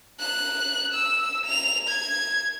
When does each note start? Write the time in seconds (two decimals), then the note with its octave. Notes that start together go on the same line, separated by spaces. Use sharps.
0.20 F#6
0.94 E6
1.46 F7
1.88 G#6